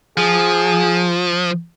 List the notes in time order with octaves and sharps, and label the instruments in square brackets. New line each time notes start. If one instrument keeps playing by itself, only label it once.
[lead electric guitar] F3 [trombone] G#4